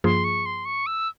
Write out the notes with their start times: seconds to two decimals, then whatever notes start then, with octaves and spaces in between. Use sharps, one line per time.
0.04 G2 F3 A#3 F4 G#4 C6
0.24 C#6
0.46 C6
0.65 C#6
0.86 E6